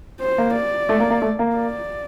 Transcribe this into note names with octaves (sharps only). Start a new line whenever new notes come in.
C5
A#3
D5
A3
A#3
A#3
A3
A#3
D5